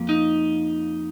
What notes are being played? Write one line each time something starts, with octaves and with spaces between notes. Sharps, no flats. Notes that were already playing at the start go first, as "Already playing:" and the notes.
Already playing: F2 F3 A#3
D#4